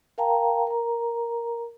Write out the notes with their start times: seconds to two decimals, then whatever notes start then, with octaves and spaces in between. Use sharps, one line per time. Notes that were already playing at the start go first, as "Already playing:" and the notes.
0.18 A#4 F5 G5 A5 A#5
0.67 A#4 A#5